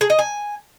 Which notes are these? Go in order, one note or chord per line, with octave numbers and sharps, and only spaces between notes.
G#4
D#5
G#5